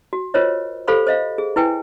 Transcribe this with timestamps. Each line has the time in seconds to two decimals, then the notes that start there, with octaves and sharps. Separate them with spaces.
0.13 F#4
0.34 F4 A#4 C5 C#5 D#5
0.88 G4 A4 C5 F5 B5 C#6
1.07 C5 D#5 F5
1.38 G#4
1.56 E4 B4 G5 G#5